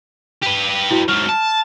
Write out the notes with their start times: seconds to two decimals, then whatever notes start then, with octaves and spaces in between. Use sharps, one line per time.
0.43 G4 B4 F7
0.91 E4 F#4
1.09 G#2 F#3 F6
1.29 A5